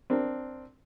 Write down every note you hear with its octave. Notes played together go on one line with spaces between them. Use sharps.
C4 D4 A#4